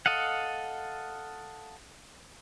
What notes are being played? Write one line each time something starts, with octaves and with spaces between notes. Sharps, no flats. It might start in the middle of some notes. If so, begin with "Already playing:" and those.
A4 D#5 F5 F#5